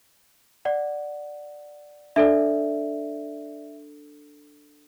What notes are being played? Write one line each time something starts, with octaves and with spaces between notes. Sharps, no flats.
D5 F#5
D4 A4 D5 E5